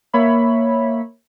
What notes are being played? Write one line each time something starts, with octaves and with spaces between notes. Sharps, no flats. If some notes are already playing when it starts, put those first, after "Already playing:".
A#3 C#5 E5 B5